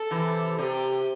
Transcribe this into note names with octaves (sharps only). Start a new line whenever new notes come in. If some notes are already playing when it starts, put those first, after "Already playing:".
Already playing: A4
C3 E3
C3 G4